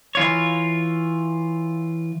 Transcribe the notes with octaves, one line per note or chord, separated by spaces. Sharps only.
E3 F4 C#5